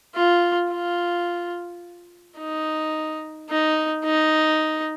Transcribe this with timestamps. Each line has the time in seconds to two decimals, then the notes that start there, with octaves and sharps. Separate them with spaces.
0.15 F4
0.72 F4
2.38 D#4
3.50 D#4
4.04 D#4